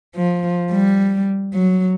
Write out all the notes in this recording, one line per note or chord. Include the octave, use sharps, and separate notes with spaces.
F3
G3
F#3